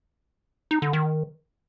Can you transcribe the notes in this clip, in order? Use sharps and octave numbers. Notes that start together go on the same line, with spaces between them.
D#4
D3
D#3